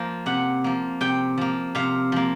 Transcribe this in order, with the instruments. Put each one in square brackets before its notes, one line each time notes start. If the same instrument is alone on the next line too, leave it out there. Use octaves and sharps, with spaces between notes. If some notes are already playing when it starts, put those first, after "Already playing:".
Already playing: [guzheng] F3 A#3
C3 F#5
F3 A#3
C3 G5
F3 A#3
C3 F5
F3 A#3